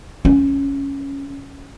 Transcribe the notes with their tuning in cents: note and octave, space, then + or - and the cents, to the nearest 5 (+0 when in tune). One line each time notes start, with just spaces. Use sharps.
C#4 +0